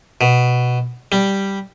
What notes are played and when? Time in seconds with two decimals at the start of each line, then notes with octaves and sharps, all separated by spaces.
0.21 B2
1.12 G3